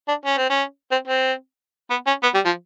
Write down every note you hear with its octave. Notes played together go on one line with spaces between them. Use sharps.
D4
C#4
C4
C#4
C4
C4
B3
C#4
B3
G3
F3